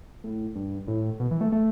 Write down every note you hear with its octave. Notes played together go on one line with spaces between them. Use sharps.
A2
G2
A2
B2
E3
A3
A3